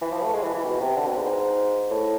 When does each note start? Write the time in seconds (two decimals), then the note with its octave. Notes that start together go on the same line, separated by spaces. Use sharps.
0.01 E3
0.12 F3
0.23 A3
0.33 G#3
0.43 E3
0.54 E3
0.65 B2
0.81 C3
0.96 D3
1.07 B2
1.17 G#2
1.91 A2